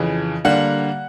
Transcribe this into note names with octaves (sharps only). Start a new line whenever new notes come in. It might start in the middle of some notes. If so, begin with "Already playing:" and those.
Already playing: F2 C#3 E3
D3 G3 A#3 F#5